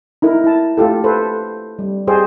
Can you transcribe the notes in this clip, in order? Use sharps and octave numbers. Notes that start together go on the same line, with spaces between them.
D#4 E4 A#4
E4 A5
A3 F4 G4 A4
A4 B4 C5
G3
G4 G#4 C5 D5 D#5